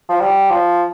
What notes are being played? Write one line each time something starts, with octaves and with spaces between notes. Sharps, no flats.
F3
G3
F3